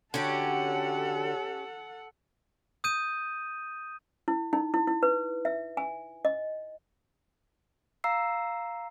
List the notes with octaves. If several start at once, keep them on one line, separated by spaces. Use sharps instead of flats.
D3 C#4 F#4 G4 A4 F#5
D#6 G6 D#7
E4
D#4
E4
E4
B4
E5
G#5
D#5
F5 A#5 E6 C7